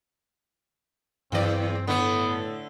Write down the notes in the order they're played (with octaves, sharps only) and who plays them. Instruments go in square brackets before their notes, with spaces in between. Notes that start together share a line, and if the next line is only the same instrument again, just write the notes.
[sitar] E2 D5 [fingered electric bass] G2 F#3 [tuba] E3 [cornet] C4
[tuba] A2 [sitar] D3 A3 [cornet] B3